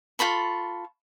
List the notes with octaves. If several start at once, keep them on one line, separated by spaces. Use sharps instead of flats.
F4 A4 B5 C#6